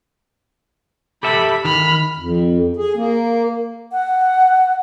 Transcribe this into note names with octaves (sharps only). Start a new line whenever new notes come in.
G4 A4 E5 B5
D#3 B5 F6
F2
G#4
A#3
F#5